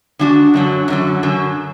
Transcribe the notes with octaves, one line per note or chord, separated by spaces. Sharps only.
D3 G#3 D4 F#4
F#2 D3 F#3
F#2 D3 F#3
F#2 D3 F#3